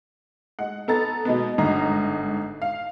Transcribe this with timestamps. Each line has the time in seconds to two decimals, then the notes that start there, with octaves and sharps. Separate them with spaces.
0.59 G#3 F#5
0.88 B3 A4 A#5 A6
1.25 B2 G#3 B3
1.58 G1 G#2 D#5 A#5
2.62 F5